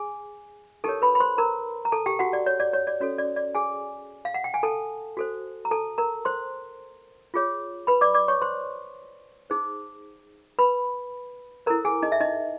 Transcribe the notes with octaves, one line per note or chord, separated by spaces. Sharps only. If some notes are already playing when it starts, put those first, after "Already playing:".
Already playing: G#4 G#5
D#4 G4 A4 A#4 C#5 A5
B4 B5
B5
C5 C6
A#4 A#5
A#5
A4 A5
G4 G5
F#4 F#5
D5
C#5
D5
C#5
D5
C#4 F#4 A4 C#5
D5
D5
G#4 G#5
F5
F#5
G5
G#5
A4 A5
F#4 A4 C5
A#5
A4 A5
A#4 A#5
C5 C6
F4 G#4 C#5
B4 B5
D5 D6
D5 D6
C#5 C#6
C5 C6
D#4 G#4 C5
B4 B5
E4 A4 A#4 C5 A#5
G#4 G#5
D#4 D#5
E5
D#4 D#5